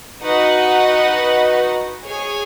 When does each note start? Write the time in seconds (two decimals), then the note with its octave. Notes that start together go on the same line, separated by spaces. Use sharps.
0.22 D#4 F#4 B4 D#5 F#5
2.05 G#4 C#5 G#5